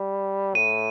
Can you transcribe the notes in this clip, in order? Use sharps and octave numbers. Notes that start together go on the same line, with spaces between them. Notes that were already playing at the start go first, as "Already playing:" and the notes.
Already playing: G3
A2 D#7